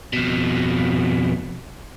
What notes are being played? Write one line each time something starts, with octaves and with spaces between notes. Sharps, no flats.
F2 B2